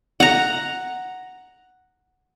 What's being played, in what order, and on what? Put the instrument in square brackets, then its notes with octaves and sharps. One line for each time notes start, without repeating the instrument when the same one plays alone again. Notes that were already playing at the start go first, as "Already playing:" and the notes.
[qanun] F#5 A#5